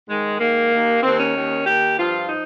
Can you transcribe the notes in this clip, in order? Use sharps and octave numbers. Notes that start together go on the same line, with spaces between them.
G#2 D#3 G#3
G#2 D#3 A#3
D#2 D#3
D#2 D#3 C4
C#4
D#2 D#3
D#2 D#3 G4
G2 F3 F4
F3 D#4